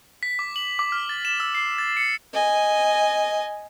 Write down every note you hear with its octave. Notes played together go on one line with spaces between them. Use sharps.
B6
D6
F#7
D6
F6
A6
E7
E6
C7
A6
C#7
D#5 G#5